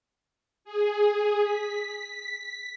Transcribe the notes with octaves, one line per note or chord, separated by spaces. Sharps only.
G#4
B6